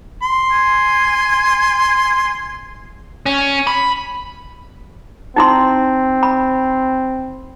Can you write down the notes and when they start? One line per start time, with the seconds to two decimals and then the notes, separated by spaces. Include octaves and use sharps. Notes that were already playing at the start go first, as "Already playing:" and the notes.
0.22 C6
0.51 G#5
3.26 C#4
3.67 B5
5.36 C4 D#4 E4 C6
6.23 B5